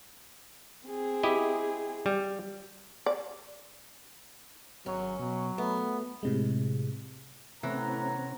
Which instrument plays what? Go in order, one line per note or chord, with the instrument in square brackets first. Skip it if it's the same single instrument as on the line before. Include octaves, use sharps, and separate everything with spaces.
[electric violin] C4 G#4
[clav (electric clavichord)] E4 G4 D#5
G3
[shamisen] D5
[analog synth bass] G#1 [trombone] F#3 [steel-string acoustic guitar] C#4
[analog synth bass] B2 [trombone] F#3
[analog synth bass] A3 [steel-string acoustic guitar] B3
[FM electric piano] A2 C3 G#3
[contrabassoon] A2 [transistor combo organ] C3 C4 C#4 [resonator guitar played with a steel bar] E3 [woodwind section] F#5 G#5 A#5